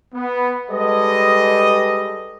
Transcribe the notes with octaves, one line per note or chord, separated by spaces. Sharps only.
B3
G3 G#3 A4 B4 D#5